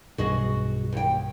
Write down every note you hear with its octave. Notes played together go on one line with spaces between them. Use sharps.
B1 G2 F#4 G#4 D#5
D#2 G5